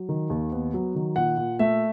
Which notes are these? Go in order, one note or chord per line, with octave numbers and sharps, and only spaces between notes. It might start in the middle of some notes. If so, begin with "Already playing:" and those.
Already playing: F#3
D#3
D#2
B3
F#3
D#3
A#2 F#5
A#2
A3 E5